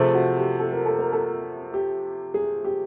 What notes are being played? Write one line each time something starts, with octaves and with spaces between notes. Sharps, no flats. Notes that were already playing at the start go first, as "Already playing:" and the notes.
Already playing: C3 F3 A3 G#4
F#4
G4
A4
A#4
A4
A#4
A4
G4
G#4
G4